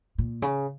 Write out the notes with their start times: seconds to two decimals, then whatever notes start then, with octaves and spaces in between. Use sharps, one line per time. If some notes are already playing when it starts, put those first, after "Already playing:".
0.18 A#2
0.42 C#3